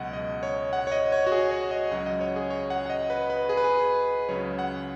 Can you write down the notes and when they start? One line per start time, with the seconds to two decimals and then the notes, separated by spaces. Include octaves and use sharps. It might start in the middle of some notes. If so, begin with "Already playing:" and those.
Already playing: C#2 B2 F#3 D#5 F#5
0.13 D#5
0.43 C#5
0.73 F#5
0.87 C#5
0.92 D#5
1.12 C#5
1.26 F#4
1.32 G#4
1.51 C#5
1.71 D#5
1.91 C#2 C#3 F#3 F#5
2.06 D#5
2.21 C#5
2.36 G#4
2.50 C#5
2.70 F#5
2.86 F#5
2.90 D#5
3.10 B4
3.30 B4
3.49 G#4
3.57 B4
3.64 G#4
4.29 C#2 C#3 F#3 C#5
4.59 F#5